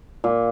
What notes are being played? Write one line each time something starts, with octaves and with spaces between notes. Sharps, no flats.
A#2